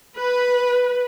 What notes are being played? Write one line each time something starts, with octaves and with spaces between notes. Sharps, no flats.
B4